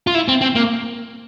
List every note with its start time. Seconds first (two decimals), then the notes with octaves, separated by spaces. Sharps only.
0.07 F4
0.15 E4
0.28 C4
0.41 C4
0.55 A#3